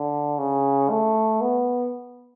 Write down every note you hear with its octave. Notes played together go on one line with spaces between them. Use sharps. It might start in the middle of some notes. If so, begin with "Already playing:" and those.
Already playing: D3
C#3
A3
B3